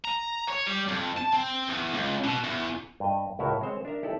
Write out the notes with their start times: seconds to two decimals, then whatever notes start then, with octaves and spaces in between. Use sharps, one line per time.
0.05 A#5
0.50 C#5
0.67 G3
0.88 F2
1.17 A5
1.33 C4
1.70 E2
1.94 C#2
2.24 B2
2.44 E2
3.00 G2 D#5
3.39 C#2 A2 E4 F#4 A#4
3.61 G#3 C4 C5 C#5
3.85 D4 A#4 E5 A#5
4.03 D#4 E4 G4 A4 C#5 D5